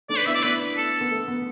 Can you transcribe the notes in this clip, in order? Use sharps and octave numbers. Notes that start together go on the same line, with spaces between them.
A3 D4 D5
B4
B3 E4 E5
D5
B3 B4
A4
B3
A3
B3